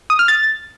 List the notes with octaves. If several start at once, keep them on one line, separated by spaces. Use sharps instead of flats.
D#6
F6
A6